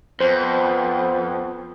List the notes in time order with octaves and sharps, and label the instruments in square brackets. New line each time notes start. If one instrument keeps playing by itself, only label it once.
[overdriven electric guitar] F2 [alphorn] B3 [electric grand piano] C5